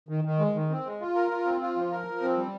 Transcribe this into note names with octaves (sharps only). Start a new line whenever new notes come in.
D#3
D#3
G#3
D#3
C4
G#3
F4
A#4
F4
C4
F4
F3
A#4
F3
C4
G3